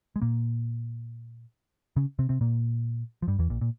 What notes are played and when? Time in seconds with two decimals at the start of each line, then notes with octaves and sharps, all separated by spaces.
0.16 G#3
0.22 A#2 A#3
1.96 C#3 C#4
2.19 C3 C4
2.29 C3 C4
2.41 A#2 A#3
3.22 F3
3.28 G2 G3
3.39 E2 E3
3.50 A#1 A#2
3.61 A#2